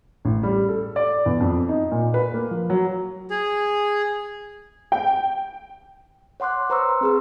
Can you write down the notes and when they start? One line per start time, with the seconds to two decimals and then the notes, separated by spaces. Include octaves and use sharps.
0.25 A1
0.43 G3
0.69 A4
0.96 D5
1.26 E2
1.40 F2
1.69 D#4
1.92 A#2
2.14 B4
2.34 A#3
2.51 F3
2.70 F#3
3.30 G#4
4.92 G5
6.40 C#5 F#5 C6 D6 F#6
6.70 B4 C5 A#5 C6 C#6 E6
7.01 C4 G#4 B4